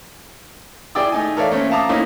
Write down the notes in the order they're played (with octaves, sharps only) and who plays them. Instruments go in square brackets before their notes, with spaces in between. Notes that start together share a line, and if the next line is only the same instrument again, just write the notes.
[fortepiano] E4 G#4 D5 G5 D6 E6
A3 D#4 G#5
A4 A#4 C#5 D5 E5 F5
A3 A#3 C4 C#4
E5 F5 A5 A#5 D6 D#6
A3 A#3 C4 C#4 D#4 E4